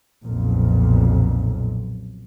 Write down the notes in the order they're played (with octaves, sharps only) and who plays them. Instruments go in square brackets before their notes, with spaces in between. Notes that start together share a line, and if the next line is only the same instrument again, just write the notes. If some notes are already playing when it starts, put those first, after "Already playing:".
[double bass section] B1 F2 A#2